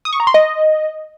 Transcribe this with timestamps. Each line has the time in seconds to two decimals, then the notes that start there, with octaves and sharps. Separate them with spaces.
0.05 D#6
0.13 C#6
0.20 A#5
0.27 C6
0.34 D#5